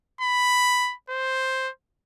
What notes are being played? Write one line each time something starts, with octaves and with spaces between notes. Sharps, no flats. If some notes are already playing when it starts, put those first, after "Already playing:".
B5
C5